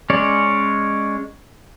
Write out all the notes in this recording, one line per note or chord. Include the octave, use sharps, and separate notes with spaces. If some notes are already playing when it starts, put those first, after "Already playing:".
G#3 C#4 C#5 D5